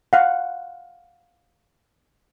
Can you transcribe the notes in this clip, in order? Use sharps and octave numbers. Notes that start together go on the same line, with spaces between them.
F5 F#5